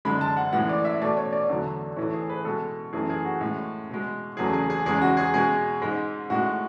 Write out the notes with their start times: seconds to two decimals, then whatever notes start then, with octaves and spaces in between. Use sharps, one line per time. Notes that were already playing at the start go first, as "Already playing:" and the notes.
0.05 F#2 D3 G#3 B5
0.21 A5
0.37 F#5
0.53 A2 E3 G#3 F#5
0.69 D5
0.85 E5
1.01 B2 A3 D5
1.17 C#5
1.33 D5
1.49 E2 D3 F#3 A3
1.97 A2 E3 A3 C#5
2.14 G#4
2.30 B4
2.45 B2 G#3 A4
2.93 F#2 E3 A3 G#4
3.10 G#4
3.25 F#4
3.41 A2 G#3
3.90 B2 G#3
4.37 E2 C#3 F#3 A3 G#4
4.53 G#4
4.70 G#4
4.86 E2 C#3 G#3 G#4
5.02 F#4
5.17 G#4
5.34 B2 G#3 G#4
5.82 G#2 G#3
6.30 A2 G#3 F#4